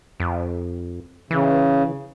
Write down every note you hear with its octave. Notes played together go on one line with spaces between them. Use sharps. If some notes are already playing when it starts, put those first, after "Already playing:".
F2
C#3 E3